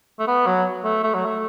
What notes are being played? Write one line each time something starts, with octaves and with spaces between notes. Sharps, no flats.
A3
B3
F#3
A3
A3
F#3
A3